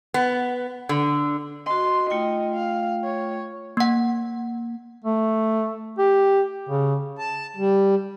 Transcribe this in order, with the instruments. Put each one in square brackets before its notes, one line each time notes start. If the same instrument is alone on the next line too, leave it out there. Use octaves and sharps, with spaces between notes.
[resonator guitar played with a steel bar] B3
D3
[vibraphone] F#4 D#5 [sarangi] C6
[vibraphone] A3 F4 G5 [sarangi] D#4
[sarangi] F5
C#5
[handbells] A#3 F#5
[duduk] A3
G4
C#3
[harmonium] A5
G3